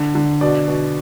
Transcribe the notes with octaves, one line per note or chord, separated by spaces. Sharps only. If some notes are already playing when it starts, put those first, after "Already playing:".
Already playing: D3
D3
B2 D5
B2